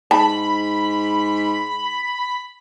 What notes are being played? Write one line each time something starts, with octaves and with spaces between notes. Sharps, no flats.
G#2 A5 B5